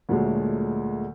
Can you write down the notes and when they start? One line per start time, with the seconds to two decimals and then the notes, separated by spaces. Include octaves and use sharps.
0.09 D2 A#2 F#3 G#3 A3